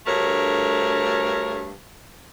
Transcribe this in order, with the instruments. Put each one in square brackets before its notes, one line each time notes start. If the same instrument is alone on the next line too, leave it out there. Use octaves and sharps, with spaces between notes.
[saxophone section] D2 G2 A3 A#4 C#5